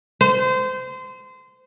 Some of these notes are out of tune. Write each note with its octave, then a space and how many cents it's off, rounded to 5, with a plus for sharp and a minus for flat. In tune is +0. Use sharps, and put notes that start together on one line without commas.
C5 -25